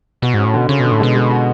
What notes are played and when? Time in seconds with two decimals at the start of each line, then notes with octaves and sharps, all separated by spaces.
0.22 B2 F#4
0.34 G#2 C#4
0.45 A2
0.53 B2 D3
0.69 C#3 C#4
0.80 B2 D3
0.92 A2
1.00 B2 G#3
1.15 G#3
1.30 F#4